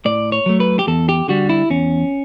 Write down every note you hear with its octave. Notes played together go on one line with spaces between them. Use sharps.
A2 D5
C#5
F#3 A3
B4
G4
E2 A4
G4
D3 G3 F#4
E4
E2 C#4